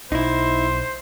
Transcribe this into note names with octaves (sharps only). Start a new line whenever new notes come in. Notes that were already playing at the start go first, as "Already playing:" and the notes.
B1 D#4 E4 C5